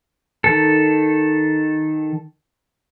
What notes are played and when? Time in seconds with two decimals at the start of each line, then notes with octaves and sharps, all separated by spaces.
0.44 D#3 A4